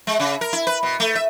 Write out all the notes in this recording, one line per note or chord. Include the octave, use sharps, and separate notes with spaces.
G#3
C#3
A#4
E4
B4
B2
A3
E5